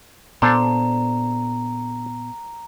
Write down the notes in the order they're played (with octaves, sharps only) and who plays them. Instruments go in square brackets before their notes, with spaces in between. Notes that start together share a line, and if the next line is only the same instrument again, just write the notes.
[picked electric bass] A#2 B3 [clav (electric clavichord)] D4 A4 C5 [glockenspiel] A#5